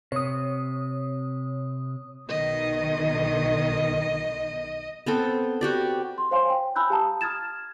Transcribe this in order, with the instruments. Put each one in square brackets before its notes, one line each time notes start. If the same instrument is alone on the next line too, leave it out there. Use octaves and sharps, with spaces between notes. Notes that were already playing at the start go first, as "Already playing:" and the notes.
[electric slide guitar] C3 [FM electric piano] C#5 D#6
[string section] B1 B2 D#3 [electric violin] D#5
[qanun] B3 C4 A4
F#4 G4 D5
[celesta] C6
C5 C#5 F5 G#5 C6
G5
G#5 B5 E6 F#6 G6
G4 F5 A5 A#5 D#6
D#6 F6 G#6 A6 E7